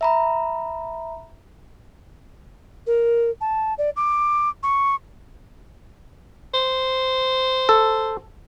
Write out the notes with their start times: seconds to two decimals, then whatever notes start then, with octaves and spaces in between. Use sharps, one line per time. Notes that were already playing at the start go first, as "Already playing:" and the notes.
0.01 E5 A#5 B5
2.87 A#4
3.41 A5
3.78 D5
3.96 D6
4.63 C#6
6.54 C5
7.69 A4